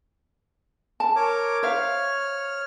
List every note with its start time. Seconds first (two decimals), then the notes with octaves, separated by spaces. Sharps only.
1.00 A5
1.16 A#4 C#5 D6
1.63 C5 C#5 E5 F5 F6